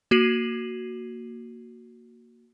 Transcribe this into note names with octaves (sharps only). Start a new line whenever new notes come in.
A#3 F#4 C7 D#7 F#7